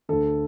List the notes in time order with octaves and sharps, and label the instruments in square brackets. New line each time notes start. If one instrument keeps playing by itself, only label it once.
[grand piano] D2 D3 A4